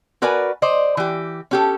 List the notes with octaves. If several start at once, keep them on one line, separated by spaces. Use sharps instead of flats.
F#4 A#4 B4 D5 G#5
C5 D5 D#5
E3 G4
C#4 G4 A4